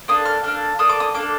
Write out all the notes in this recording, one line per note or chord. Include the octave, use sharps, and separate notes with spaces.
A#3 D4 A4 D#6
F6
A#3 D4 A4 F6
A#3 D4 A4 D#6
D6
D#6
A#3 D4 A4 D6